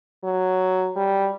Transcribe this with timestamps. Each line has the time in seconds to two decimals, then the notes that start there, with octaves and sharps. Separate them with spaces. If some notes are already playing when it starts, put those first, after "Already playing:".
0.24 F#3
0.96 G3